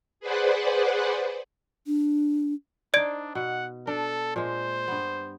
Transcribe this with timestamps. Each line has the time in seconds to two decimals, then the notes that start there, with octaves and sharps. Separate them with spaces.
0.20 G#4 B4 C5 D5 F#5
1.87 D4
2.94 D4 D#4 C5 D5 G#6 D7
3.35 B2 F#5
3.87 D4 A4
4.36 A#2 G#3 C5
4.88 G2 B3